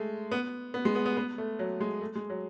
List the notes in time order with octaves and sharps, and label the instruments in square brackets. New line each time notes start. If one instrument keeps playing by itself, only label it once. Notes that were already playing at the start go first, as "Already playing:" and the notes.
Already playing: [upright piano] G#3 A3
B3
B3
G#3
B3
B3
B3
A3
F#3
G#3
A3
G#3
F#3